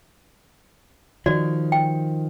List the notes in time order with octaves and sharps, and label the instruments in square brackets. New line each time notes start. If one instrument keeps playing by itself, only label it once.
[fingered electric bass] D#3 F3 [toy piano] F#4 D5
[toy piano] G5